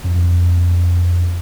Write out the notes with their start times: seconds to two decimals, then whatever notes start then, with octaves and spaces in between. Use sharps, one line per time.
0.04 F2